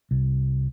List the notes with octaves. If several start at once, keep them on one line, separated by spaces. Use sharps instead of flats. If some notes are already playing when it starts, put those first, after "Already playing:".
C2